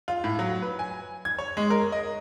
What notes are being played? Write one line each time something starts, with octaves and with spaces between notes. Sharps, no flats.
F4
A2
F#3
B4
G#5
G#6
C#5
G#3
A#4
D#5